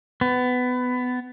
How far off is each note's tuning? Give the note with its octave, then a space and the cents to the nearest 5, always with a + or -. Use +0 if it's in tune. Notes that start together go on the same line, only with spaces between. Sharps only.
B3 +20